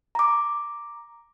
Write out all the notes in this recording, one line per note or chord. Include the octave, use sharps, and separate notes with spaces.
A#5 D6